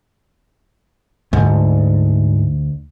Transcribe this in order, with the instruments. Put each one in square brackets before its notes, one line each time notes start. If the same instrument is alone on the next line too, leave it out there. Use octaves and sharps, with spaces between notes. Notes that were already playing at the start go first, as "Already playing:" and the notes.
[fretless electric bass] D2 [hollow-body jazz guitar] G#2